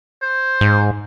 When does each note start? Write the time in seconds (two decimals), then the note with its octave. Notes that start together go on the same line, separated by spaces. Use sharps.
0.22 C5
0.61 G#2